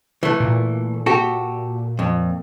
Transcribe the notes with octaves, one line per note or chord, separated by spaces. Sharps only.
E3 A3
A#2
F#4 G4 A4
F2